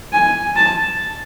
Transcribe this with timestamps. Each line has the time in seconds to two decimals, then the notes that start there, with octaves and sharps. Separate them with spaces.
0.13 G#5
0.56 A5